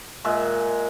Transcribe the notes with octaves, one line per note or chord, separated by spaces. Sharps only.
A#2 G#3 E5